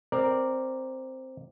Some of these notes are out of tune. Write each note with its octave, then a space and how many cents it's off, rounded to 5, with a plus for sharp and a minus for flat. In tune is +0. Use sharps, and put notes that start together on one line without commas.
C4 +0 A#4 +0 D5 +0